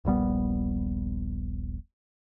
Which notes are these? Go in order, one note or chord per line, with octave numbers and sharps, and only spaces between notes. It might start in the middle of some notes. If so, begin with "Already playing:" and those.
D#1 A#1 G3 B3